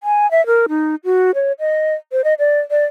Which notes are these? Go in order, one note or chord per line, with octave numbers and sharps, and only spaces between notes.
G#5
E5
A#4
D#4
F#4
C#5
D#5
C5
D#5
D5
D5